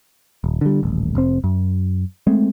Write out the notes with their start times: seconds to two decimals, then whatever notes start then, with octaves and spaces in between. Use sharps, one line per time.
0.44 D#1
0.61 D3 G3
0.83 D#1 A1
1.15 F1 C4
1.44 F#2
2.27 G#3 A3 C4